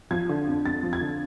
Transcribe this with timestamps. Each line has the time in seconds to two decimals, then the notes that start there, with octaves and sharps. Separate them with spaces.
0.11 F3 G#6
0.29 D3
0.47 F2
0.65 F2 A6
0.83 F3
0.93 G#6
1.01 D3